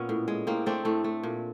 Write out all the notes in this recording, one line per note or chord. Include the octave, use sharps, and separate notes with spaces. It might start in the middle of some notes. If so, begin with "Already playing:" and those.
Already playing: A#2 B3 C#4
A2
G#3
A2 A#3 C4
A3 C4 D4
A2 A3
A3
A#2